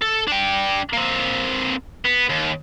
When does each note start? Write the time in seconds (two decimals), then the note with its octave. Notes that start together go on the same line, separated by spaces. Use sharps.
0.02 A4
0.28 D4 G5
0.93 A#3 C4
2.05 B3
2.29 D#2